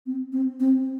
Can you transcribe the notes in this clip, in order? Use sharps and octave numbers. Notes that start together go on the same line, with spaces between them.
C4
C4
C4